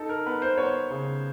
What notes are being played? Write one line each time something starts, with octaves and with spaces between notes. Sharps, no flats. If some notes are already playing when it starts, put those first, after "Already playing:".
Already playing: D#4 A4
A#4
B3 B4
C5
B3 C#5
C#3